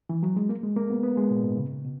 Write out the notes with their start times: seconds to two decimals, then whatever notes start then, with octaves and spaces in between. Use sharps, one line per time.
0.09 E3
0.23 F#3
0.36 G#3
0.49 A#3
0.63 G#3
0.76 A#3
0.90 B3
1.03 B3
1.17 G#3
1.30 A#2
1.43 G#2
1.57 C#3
1.85 B2